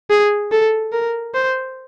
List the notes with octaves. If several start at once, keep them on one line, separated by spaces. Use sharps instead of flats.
G#4
A4
A#4
C5